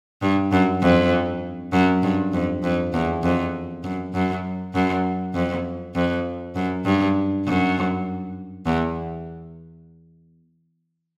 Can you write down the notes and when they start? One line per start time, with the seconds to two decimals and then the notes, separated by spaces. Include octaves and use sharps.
0.22 G2
0.52 F#2
0.82 F2
1.73 F#2
2.03 G2
2.33 F2
2.64 F2
2.94 E2
3.24 F2
3.84 F#2
4.14 F#2
4.75 F#2
5.35 F2
5.95 F2
6.56 F#2
6.86 G2
7.46 F#2
8.66 E2